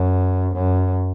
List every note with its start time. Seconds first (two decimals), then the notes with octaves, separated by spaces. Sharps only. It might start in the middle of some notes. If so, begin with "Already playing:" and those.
Already playing: F#2
0.54 F#2